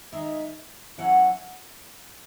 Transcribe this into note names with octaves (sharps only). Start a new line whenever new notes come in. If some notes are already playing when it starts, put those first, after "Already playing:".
D#3 G#3 D#4 E5
F#3 A3 C#4 E4 F#5